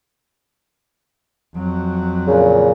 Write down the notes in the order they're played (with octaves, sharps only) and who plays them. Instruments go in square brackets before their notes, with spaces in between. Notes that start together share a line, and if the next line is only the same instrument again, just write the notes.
[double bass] F2 F#3
[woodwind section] A#2 C#3